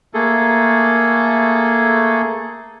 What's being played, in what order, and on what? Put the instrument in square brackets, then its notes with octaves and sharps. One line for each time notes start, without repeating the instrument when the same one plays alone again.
[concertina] A3 A#3 G#4 A4